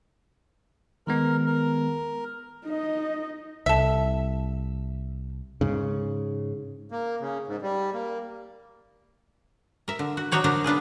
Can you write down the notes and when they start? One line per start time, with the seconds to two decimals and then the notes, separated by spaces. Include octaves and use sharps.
1.07 D#3 G#3 B3 A#4
1.46 A#4
2.65 D#4 D#5
3.66 C2 A4 E5
5.61 G#2 C#3
6.92 A#3
7.20 C#3
7.48 G#2
7.62 G3
7.93 A#3
9.88 A#4 E5
9.99 D3
10.17 F#4
10.32 F#3 D4 D#4 F#4 C#5 D5
10.44 D3 D4 A#4 C5
10.64 B3 D4 F4 G#4